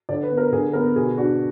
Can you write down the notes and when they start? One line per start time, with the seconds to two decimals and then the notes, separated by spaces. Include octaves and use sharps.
0.09 D3 D5
0.23 B4
0.30 B3
0.37 A#4
0.52 D3 G#4
0.73 B3 A#4
0.96 B2 G#4
1.17 D4 F#4